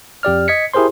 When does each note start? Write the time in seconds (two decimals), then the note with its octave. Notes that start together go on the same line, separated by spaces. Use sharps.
0.23 F2 G4 D5 F6
0.48 D#5 G#6 B6 C#7
0.74 E4 G4 G#4 A#4 C5 C6